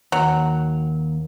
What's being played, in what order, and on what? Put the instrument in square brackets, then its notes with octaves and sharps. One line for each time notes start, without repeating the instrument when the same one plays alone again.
[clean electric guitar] D#2 [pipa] F#3